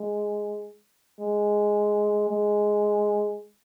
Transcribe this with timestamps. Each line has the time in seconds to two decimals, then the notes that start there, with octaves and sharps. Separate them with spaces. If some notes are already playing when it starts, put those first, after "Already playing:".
Already playing: G#3
1.21 G#3
2.30 G#3